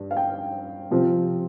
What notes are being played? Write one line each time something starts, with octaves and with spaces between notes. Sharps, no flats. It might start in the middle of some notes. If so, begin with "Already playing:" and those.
Already playing: G2 G3 D4
F5
G5
C3 F3 C4 F4